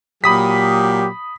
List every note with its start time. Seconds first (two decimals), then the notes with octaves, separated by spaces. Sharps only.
0.24 A#2 F#3 G4 B5 D#6 B6